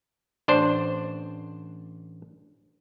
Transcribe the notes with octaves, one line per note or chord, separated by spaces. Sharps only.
A1 D4 C5